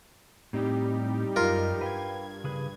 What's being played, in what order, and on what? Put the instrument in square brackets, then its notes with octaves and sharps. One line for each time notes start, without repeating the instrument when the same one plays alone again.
[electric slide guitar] A2 C4 [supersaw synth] G3 D#4 G4
[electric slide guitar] F#2 D#5 [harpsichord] F4 A#4
[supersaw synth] G2 G#6 [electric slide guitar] B4 F5 G5
[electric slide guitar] C#3 G#4 B4